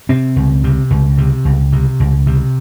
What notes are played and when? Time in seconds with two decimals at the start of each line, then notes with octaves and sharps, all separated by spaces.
0.09 C3 C4
0.36 C#2
0.64 C3
0.90 C#2
1.18 C3
1.45 C#2
1.72 C3
2.00 C#2
2.27 C3